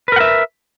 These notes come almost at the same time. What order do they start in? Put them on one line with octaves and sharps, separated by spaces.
B4 A#4 F#5 E5